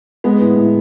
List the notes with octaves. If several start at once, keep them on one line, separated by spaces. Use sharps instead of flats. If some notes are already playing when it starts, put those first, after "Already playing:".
G#3 B3
A2
A2